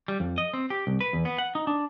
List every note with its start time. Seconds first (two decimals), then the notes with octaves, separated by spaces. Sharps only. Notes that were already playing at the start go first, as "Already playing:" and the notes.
0.08 G3
0.20 F2
0.38 D#5
0.54 C4
0.70 G4
0.87 C2
1.01 B4
1.13 E2
1.25 B3
1.38 F#5
1.55 D#4
1.67 D4